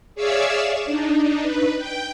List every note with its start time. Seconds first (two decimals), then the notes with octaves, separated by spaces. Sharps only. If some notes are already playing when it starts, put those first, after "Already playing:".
0.15 G#4 C#5 D5 E5 F5 E6
0.86 D4 D#4
1.42 B4
1.78 G5